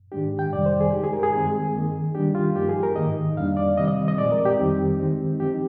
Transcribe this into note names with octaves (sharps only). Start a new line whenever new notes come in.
G#2 D#3 G#3 D4 G4
G5
F2 C3 D#3 G3 D5
C5
G#4
D3 G#3 D#4 G4
G#4
A#4
G#4
G2 D#3 G#3 C4 G#4
D#3 A#3 D#4
D#3 G3 D4 G4
F4
G2 F3 A#3 D#4 G4
G#4
A#4
G#2 D#3 A#3 D#4 D#5
F2 D3 G3 D4 F5
D5
C3 D#3 G3 C4 D#5
D#5
D#5
A#2 F3 G#3 C4 D5
A#4
G4
F2 D#3 G3 C4 D#4
D#3 G#3 C4 D#4
D3 F3 C4 D#4 G4